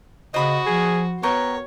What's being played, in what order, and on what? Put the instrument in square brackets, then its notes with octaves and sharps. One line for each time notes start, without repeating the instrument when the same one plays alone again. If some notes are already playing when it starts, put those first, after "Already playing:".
[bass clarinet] C#3 [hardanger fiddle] F#4 [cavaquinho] C5 B5 D#6 [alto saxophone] D#5
[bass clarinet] F3 [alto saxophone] G#4
[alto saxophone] B3 [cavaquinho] A#4 G5 C#6 [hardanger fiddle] C#5